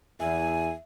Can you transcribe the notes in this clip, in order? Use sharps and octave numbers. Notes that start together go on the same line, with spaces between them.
E2 E5 G#5